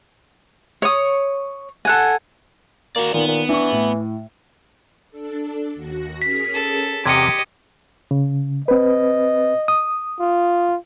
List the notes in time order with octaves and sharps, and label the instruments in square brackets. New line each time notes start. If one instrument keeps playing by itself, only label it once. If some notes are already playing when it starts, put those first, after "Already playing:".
[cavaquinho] C#5 C#6 D#6
A4 F#5 G#5
[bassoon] A#3 [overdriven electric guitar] F#4 D5
[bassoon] A#2 [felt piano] D#3 [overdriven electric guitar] B3
[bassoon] A#2
[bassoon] E3 [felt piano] D4 C#6
[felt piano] A2
[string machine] D4 A4
D#2 F#4 A#6
[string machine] C#4 G#4 A#4 [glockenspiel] B6
[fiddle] A4
[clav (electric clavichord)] E2 C3 [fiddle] G4 D#5 [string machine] C6 D6 [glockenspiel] G#6 C#7
[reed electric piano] C#3
[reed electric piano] C4 B4 [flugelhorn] D#5
[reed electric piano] D#6
[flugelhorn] F4